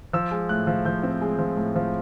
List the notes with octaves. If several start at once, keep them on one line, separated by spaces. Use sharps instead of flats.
F3 E6
G#3
A2 F#6
F3
F3 G6
C4
G#3
F3
A2
F3